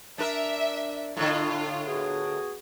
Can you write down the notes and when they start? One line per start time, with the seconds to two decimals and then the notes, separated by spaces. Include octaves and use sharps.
0.18 D4 A#4 E5
1.17 A2 D3 F4
1.86 B3 F#4 G#4